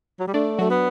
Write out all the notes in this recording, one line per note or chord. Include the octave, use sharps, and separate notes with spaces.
F#3
G3
A3 D4 D5
F#3 A3 F#4
B3